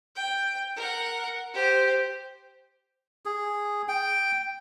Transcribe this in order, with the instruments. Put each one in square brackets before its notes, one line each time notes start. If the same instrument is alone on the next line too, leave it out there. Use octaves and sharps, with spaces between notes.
[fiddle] G5
A#4 F#5
G4 C5
[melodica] G#4
G5